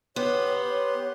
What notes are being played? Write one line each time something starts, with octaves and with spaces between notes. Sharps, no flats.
B3 G4 C#5 F#5 C6
C#5